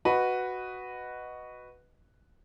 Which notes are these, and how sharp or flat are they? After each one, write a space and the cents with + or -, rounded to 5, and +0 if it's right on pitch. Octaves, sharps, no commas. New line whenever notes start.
F#4 +0 B4 +0 D#5 +0